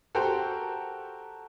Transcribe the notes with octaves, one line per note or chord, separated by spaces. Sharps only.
F#4 G4 A4 A#4 C5 G5